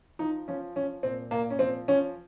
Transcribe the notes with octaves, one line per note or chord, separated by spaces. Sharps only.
F3 D#4
F3 C#4
F3 C#4
A#2 C4
A#2 A#3
C#4
F3 C4
F3 C#4